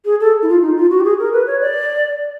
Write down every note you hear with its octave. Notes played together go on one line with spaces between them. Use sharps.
G#4
A4
E4
F4
D#4
F4
F#4
G4
G#4
A#4
B4
C#5
D5